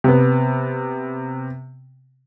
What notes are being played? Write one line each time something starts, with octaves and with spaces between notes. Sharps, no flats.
C3 B3